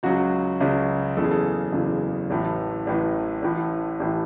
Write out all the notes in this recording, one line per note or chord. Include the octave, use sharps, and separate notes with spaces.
C#2 C#3 F#3 F#4
C#2 C#3 F#3
F#1 E2 C#3 E3 A4
G#4
A4
F#1 E2 C#3 E3
A1 A2 E3
A1 A2 E3
A1 A2 E3
A1 A2 E3